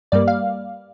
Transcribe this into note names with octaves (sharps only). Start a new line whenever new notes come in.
G2 G3 A#3 D5
F5